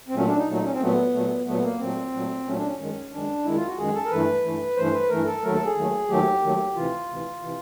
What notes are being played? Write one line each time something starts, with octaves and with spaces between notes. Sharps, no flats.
C4
A#2 F#3 A3 C#4
D4
D#4
A#2 F#3 A3
D#4
C#4
C4
A#2 F#3 A3 B3
A#2 F#3 A3
A#2 F#3 A3 B3
A#3
A#2 F#3 A3 C4
A#2 F#3 A3
A#2 F#3 A3 C#4
D4
C#4
F#2 D#3 G#3
F#2 D#3 G#3 D4
F#2 D#3 G#3 E4
F4
F#4
F#2 D#3 G#3 G#4
A4
A#4
G2 E3 A3 B4
G2 E3 A3
G2 E3 A3 C5
B4
G2 E3 A3 A#4
A4
D#2 D#3 F#3 A3 A#4
A4
G#4
D#2 D#3 F#3 A3
D#2 D#3 F#3 A3 G4
D#2 D#3 F#3 A3
D2 C3 E3 F4
D2 C3 E3
C3 E3